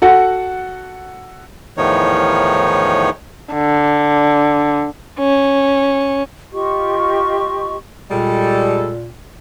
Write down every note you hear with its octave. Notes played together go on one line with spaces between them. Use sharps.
F#4 A4 F#5
E2 A2 D#3 F3 D#4 C#5
D3
C#4
F4 G4 D#5 C#6
A#2 G3 G#3 A4